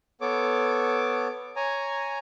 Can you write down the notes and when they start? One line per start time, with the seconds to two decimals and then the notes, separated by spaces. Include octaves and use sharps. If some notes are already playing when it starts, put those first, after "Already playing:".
0.21 B3 A4 C#5 D6
1.56 C#5 G#5 A#5